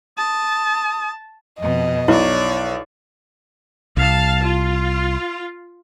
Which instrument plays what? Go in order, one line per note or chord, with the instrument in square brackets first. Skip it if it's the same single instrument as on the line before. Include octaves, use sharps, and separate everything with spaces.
[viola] A5 [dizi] D#6
[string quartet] F2 B2 [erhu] D#5
[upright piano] B1 [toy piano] E4 [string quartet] C#5 D5
[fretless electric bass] C2 [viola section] F5 A5
[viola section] F4